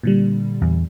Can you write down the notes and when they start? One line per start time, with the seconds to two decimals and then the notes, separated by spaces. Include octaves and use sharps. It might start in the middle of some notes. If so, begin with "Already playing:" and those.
0.03 A#2 D3 G3
0.62 E2